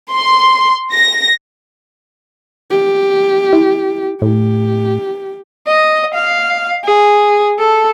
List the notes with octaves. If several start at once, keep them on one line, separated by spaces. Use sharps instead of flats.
C6
A#6
G4
E4
A2 G4
D#5
F5
G#4
A4